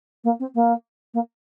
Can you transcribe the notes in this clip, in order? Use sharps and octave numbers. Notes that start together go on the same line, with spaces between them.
A#3
C4
A#3
A#3